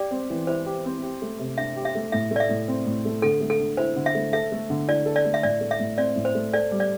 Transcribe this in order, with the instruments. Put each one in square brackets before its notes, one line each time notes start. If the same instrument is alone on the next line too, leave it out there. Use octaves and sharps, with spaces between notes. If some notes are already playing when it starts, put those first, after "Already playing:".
Already playing: [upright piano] G4 [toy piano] D5
[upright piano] C4
E3
[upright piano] E4 [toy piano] C5
[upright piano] G4
C4
G4
A3
C3
[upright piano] D4 [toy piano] E5
[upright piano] G4
[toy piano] E5
[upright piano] A3
[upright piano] A2 [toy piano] E5
[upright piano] A3 [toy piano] D5
[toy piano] E5
[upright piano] A2
C4
A2
A3
[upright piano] D3 [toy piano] A4
[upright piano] A3
[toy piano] A4
[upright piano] D3
[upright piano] E4 [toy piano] C5
[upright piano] D3
[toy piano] E5
[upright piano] A3
[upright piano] A4 [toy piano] E5
[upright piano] A3
D3
[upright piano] E4 [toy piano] D5
[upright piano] A4
[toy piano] D5
[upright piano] A3
[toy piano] E5
[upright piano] A2 [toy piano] D5
[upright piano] A3
[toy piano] E5
[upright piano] A2
[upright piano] C4 [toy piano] D5
[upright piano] A2
[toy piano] C5
[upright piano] A3
[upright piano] A4 [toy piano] D5
[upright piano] G3
[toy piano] D5